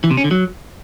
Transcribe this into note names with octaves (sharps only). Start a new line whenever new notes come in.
E3
C3
C#4
D3
F#3